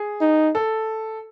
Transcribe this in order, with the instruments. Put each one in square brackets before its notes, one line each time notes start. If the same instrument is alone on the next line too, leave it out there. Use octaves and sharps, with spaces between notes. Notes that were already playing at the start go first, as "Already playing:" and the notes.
Already playing: [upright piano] G#4
[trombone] D#4
[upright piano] A4